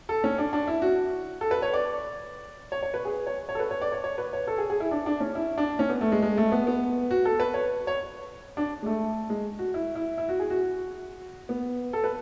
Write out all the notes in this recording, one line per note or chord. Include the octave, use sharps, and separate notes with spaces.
A4
C#4
D4
D4
E4
F#4
A4
B4
C#5
D5
C#5
C#5
B4
G#4
C#5
C#5
A4
B4
C#5
D5
C#5
C#5
B4
C#5
A4
G#4
G#4
E4
D4
D4
C#4
E4
D4
C#4
B3
A3
G#3
G#3
A3
B3
B3
F#4
A4
B4
C#5
C#5
D4
G#3
A3
G#3
F#4
E4
E4
E4
F#4
G#4
F#4
B3
A4
B4